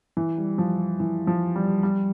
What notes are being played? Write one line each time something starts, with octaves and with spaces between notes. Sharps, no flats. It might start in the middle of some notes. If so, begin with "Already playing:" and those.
E3
G3
F3
E3
F3
G3
G3